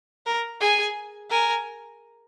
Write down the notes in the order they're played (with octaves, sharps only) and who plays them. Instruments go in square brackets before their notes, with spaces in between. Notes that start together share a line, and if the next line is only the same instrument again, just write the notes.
[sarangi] A#4
[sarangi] G#4 [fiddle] G#5
[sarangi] A#4 [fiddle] G#5